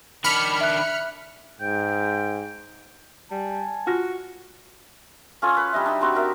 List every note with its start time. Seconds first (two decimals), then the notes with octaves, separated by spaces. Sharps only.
0.24 D#3 D4 B5 F6 C#7
0.61 E5 F#6
1.61 G#2 G5
3.31 G3 G#5 A5
3.87 F4 F#4 F6 A#6
5.42 C#4 F4 A4 G#5
5.57 B4
5.73 G3 D4 D#5 E5
5.86 D4 D#4 E6
6.00 G3 C4 F#4
6.15 D#4 A#4 E5